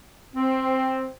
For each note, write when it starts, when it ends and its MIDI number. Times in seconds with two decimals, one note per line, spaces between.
0.35 1.12 60